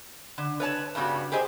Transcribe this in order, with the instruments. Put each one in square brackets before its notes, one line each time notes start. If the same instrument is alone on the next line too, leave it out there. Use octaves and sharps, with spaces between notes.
[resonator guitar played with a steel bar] D3
B4 C#5 A5
G2 C#3 G3 B3 F#4
G4 G#4 C5 D#5